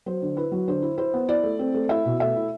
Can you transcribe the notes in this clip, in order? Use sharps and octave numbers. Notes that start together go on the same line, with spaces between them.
F#3 C5
D3
E4 B4
F#3
D3 C5
E4
E4 C5
B3
E4 D5
A3
C4
A3
E4 E5
B2
A3 E5
E4